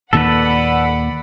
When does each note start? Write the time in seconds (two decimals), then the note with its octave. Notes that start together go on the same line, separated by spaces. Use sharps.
0.13 D#2 A#2 D#3 A4 B4 D5 F#5 B5